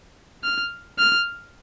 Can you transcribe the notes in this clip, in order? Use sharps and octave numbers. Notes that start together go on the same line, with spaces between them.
F6
F6